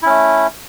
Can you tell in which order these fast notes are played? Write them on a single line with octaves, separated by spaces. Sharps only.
E4 C#4 A3